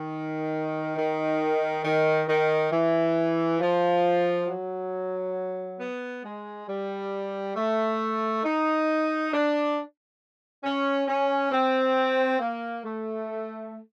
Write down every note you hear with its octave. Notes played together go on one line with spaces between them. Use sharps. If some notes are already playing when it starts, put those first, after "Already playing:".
Already playing: D#3
D#3
D#3
D#3
E3
F3
F#3
B3
G#3
G3
A3
D#4
D4
C#4
C#4
C4
A#3
A3